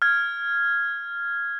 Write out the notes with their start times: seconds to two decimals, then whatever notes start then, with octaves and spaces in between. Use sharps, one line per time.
0.02 F6 G#6